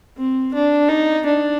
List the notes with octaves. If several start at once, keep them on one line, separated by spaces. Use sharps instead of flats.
C4
D4
D#4
D4